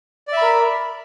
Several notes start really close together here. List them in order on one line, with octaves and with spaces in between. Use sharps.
D5 E5 B5 A#4